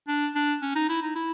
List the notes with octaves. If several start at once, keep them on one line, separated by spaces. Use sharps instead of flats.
D4
D4
C#4
D#4
E4
D#4
E4